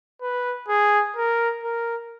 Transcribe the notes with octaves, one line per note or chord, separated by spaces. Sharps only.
B4
G#4
A#4
A#4